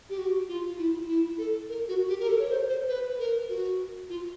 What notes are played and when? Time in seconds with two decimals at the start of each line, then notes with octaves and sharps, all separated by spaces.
0.10 G4
0.19 F#4
0.48 F4
0.78 E4
1.08 E4
1.38 A4
1.69 A#4
1.88 F#4
2.09 G4
2.20 A#4
2.28 A4
2.39 C#5
2.49 C5
2.69 C5
2.89 B4
3.19 A#4
3.49 F#4
4.09 F4